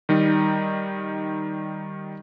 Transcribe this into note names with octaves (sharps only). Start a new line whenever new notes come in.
D#3 G3 D#4